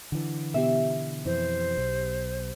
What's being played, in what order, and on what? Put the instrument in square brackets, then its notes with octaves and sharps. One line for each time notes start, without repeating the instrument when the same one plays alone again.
[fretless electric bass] D3 E3
[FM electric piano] B2 B3 G4 [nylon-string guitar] E5
[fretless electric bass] F2 E3 [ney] C5
[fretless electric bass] B1